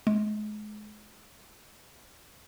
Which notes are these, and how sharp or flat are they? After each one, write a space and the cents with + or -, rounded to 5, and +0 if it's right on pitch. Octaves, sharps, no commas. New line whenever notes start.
G#3 +30